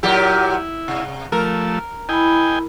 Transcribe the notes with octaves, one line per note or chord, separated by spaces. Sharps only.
A#2 F#3 E4 G4
C3
F3 A3 A#4 E6
E4 D#5 G5 G#5 B5